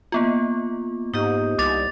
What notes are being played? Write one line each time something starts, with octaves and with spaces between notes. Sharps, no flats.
A#3 B3 F4
G#2 D#4 G4 D#5
C2 D6 A6 F7